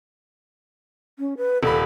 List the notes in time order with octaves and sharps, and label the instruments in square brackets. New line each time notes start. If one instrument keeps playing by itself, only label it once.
[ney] C#4
B4
[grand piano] D#1 B5 [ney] A4